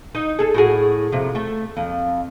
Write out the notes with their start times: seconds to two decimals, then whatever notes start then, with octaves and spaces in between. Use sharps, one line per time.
0.15 D#4
0.39 G#4 A4
0.54 A2 F#4 G#4
1.12 F2 C3
1.35 A3
1.77 F2